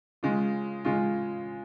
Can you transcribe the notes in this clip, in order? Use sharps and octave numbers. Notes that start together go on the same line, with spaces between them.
C#3 G#3 C#4 F4
C#3 G#3 C#4 F4